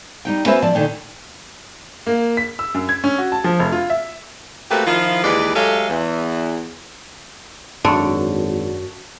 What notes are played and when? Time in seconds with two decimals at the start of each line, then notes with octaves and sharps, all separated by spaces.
0.25 G3 D#4 G5
0.46 B3 C#4 F#4 B4 C5 E5
0.62 F3 D5 A5
0.75 A#2 D3 D#3
2.07 A#3
2.37 B6
2.59 E6
2.74 F#2
2.89 G#6
3.04 C#4
3.18 F#4
3.32 A5
3.44 F3
3.59 F1
3.72 F4
3.90 E5
4.70 A3 A#3 C4 F#4 G4 B4
4.86 D#3 F3 E4 F4
5.24 D#2 E3 G#3 G4 B4 D5
5.54 F#3 G#3 A3 G4 A4 F5
5.90 E2
7.85 G#1 F#2 D3 A5 C#6